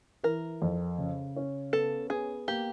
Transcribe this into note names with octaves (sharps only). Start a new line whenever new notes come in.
E3 A#4
F2
C#3
C#4
B3 A4
B3 G#4
A#3 G4